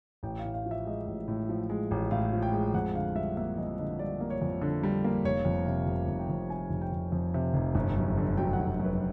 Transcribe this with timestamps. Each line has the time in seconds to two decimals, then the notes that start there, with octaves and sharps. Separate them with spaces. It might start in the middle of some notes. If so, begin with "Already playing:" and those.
0.23 A1 G5
0.39 F5
0.44 A2
0.54 F5
0.66 F3
0.71 E5
0.86 G#3 D#5
1.07 A1
1.28 A2
1.49 F3
1.70 G#3
1.91 A1
2.11 A2 F5
2.33 F3
2.42 G5
2.53 G#3
2.74 F2 F#5
2.95 D3 F5
3.15 G3 E5
3.37 A#3 E5
3.58 F2 D#5
3.78 D3 D#5
3.99 G3 D5
4.20 A#3
4.30 C#5
4.42 F2
4.61 D3
4.83 G3
5.04 A#3
5.25 F1 C#5
5.45 F2
5.66 C3
5.87 F1
6.08 F1
6.19 G5
6.30 F2
6.50 C3 G#5
6.70 F1
6.81 G5
6.92 F1
7.12 F2
7.34 C3
7.54 F1
7.75 G1
7.97 F#2
8.18 D3
8.37 F#3 G5
8.53 F#5
8.59 G1
8.80 F#2
8.85 B4